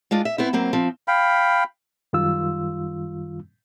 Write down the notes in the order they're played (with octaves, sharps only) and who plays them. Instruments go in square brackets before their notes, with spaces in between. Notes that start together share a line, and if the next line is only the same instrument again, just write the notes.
[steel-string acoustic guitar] G#3 D4 F4
E5
B3 C4 E4
F#3 A#3 C4
F3 C4
[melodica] F5 G5 B5
[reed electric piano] F#2 D#3 G3 F4 F5 E6